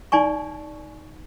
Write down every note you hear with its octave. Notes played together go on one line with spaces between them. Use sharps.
D#4 D5 G#5 C#6